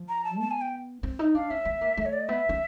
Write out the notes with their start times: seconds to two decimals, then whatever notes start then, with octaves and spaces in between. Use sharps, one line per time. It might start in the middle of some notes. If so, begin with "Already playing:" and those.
Already playing: F3
0.09 A#5
0.24 A5
0.40 B3 A5
0.51 G#5
0.61 G5
1.03 C4
1.19 D#4
1.35 D4 F5
1.50 C#4 E5
1.65 B3
1.81 A#3
1.97 A3
2.06 C#5
2.13 D5
2.21 D#5
2.28 B3 E5
2.49 C#4